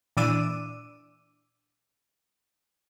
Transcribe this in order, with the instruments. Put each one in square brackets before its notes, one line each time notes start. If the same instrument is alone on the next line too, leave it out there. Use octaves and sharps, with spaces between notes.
[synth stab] A#2 E3 D4 D6 E6 D#7